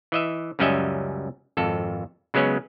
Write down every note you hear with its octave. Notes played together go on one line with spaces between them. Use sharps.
E3 D#5 E5
C#2 F#2 G3 C#4 D#5 E5
G#1 F2 A4
C#3 F#3 G#3 B3 C#4